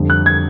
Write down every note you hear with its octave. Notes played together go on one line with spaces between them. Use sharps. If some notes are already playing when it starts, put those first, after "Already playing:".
Already playing: F2 D3 G3
F#6
G#6